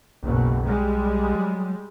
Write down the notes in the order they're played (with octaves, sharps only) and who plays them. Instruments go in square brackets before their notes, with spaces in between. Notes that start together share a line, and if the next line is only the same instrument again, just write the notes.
[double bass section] F#1 B2 [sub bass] B1
[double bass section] G3 G#3
[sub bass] F#3